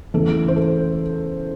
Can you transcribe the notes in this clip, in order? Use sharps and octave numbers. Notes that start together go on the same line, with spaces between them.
E2 C#3 E3 A3 A4
C5
A4